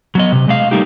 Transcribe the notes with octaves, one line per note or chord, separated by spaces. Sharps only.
F#3 B3 D#5
C3
G#3 D#5 F5
G3 A3 A#3 D#4 G4